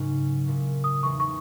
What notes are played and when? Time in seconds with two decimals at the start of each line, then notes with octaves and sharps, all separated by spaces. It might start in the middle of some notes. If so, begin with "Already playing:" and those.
Already playing: G#2 C#3 F#3 A#3 C#4 D#4
0.46 A#2 G#3 C#4 E4
0.84 D#6
1.03 E2 C#3 E3 G#3 D#4 C#6
1.20 C#6